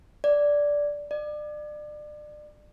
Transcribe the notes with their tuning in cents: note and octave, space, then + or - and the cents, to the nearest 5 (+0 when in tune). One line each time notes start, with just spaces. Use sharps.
D5 -5
D5 +30